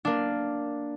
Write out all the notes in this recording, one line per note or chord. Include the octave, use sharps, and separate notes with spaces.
A#3 D4